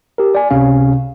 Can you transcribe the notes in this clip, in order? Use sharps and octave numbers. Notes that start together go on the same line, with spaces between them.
G4 A#4
D5 G#5
C#2 C3 C#4 F5